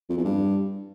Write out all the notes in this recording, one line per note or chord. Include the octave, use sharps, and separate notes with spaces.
F2
E2
G2